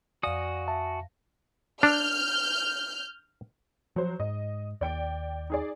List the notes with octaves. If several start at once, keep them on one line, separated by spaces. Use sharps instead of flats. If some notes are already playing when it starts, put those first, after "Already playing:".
F2 F#4 D5 F5 G#5 D#6 A#6
E5 A5
D4 F6 G6
F3 F#3 C5
G#2 D#5
D#2 D5 G5 D7
D#4 G#4 D5